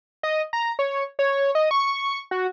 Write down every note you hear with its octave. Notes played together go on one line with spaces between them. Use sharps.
D#5
A#5
C#5
C#5
D#5
C#6
F#4